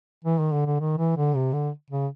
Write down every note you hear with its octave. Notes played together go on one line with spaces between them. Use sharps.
E3
D#3
D3
D3
D#3
E3
D3
C3
D3
C#3